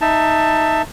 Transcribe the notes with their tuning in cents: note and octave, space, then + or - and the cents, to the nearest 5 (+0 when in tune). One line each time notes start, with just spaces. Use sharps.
D#4 +0 E5 +0 A5 +15